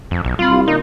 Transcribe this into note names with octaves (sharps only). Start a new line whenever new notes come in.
F2
B1
G3 C4 F4 B5
C2
A#2 D3 D#4